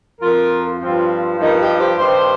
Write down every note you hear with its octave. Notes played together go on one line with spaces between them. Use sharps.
F2 F3 F4 A#4
G2 F3 C4 F4
G2 F3 A#3 D#4
D#4 G4
G4 C5
G2 D#3 G4 C5